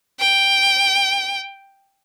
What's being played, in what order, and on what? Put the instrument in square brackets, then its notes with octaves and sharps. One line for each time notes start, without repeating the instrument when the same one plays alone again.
[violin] G5